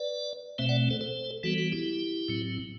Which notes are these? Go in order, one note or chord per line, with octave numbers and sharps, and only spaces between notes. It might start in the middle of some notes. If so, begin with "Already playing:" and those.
Already playing: B4 D5
B2 A3 C4 C5 E5
D5 F#5
A4 C5
A4 C5
E3 G3 B3 F#4 A4
F#4
E4 G4
A2 F#3 C4